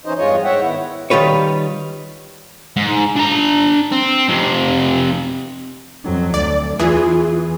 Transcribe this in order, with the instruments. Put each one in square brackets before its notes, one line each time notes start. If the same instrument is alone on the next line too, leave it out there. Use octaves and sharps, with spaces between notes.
[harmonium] E3 C#4 D#4 C5 D#5
E2 G2 G#3 F4 C#5 D#5
G#2 C#5 E5 F#5 G5
D#3 B3 E4 F#5
[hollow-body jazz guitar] D#3 G3 F4 B4 C#5
[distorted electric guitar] G#2
D4 A#5
C4
F2 C3
[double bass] F2 F#3
[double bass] D2 [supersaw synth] D5
[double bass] E2 [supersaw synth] E3 G#4 [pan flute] F4